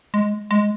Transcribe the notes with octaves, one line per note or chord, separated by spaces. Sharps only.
G#3
G#3